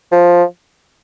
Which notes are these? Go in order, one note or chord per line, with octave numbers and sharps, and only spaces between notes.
F3